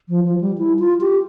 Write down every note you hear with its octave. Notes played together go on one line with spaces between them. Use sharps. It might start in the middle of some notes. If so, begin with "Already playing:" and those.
F3
F3
G3
E4
F4
G4